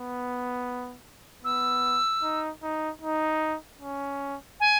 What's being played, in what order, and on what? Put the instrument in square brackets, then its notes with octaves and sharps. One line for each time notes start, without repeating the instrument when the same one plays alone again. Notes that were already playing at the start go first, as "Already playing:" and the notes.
Already playing: [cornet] B3
[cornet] B3 [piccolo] E6
[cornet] D#4
D#4
D#4
C#4
[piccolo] G#5